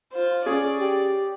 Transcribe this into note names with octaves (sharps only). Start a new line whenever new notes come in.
F4 C5
C#4 G#4 D5
G4